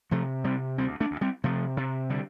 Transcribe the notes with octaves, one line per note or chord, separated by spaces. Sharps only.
C3 F3 A3
C3 G3 C4
D2 G3 C4
A3 D4
D2
G3 C4
C3 F3 A3
C3
D3 G3